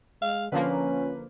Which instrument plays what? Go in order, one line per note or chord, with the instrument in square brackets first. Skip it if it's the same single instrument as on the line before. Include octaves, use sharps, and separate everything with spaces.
[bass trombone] G#3 [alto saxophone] F5
[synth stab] D3 F3 A#3 [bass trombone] C#4 [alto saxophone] B4